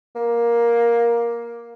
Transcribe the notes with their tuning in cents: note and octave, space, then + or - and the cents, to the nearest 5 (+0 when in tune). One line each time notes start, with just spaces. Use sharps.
A#3 +10